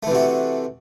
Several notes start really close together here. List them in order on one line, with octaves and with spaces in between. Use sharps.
A3 E3 C3 F#4